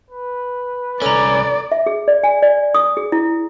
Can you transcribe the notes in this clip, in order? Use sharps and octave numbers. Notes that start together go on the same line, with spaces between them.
B4
C2 C#4 A4 D5 A#5
E5
G#4
D5
G#5
D5
D#6
G#4
E4